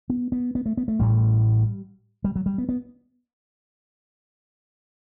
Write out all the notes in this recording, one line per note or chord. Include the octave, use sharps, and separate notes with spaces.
B3
B3
B3
A3
B3
A3
A1 A2 G3
G3
F#3
G3
B3
B3